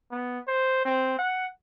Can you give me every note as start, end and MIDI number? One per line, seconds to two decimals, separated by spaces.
0.11 0.39 59
0.48 0.82 72
0.85 1.16 60
1.19 1.46 78